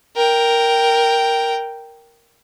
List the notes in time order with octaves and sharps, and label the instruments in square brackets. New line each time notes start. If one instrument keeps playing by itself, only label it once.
[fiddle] A#4 G5